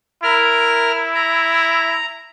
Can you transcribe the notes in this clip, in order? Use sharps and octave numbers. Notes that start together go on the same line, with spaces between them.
E4 A#4 F6
A#5